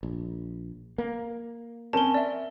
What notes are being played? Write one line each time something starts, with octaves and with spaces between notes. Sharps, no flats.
A#1
A#3
C4 C#4 A#4 A5 G7
D5 E5